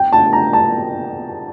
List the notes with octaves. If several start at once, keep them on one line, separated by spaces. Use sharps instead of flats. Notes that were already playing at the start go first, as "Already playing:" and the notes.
Already playing: G5
A5
A#5
A5